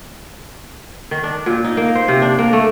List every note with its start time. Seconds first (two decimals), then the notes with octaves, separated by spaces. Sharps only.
1.11 D#3
1.24 D4
1.46 A#2
1.64 D#4
1.77 A#3
1.95 C5
2.08 C3
2.22 D4
2.39 A#3
2.53 A3